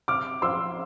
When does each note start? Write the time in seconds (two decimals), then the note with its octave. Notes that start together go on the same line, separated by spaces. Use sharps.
0.08 C3 D6 F6
0.42 F3 C4 C6 E6